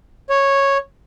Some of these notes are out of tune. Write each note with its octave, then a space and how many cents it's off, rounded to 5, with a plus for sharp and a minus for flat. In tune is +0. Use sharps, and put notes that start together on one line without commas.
C#5 -10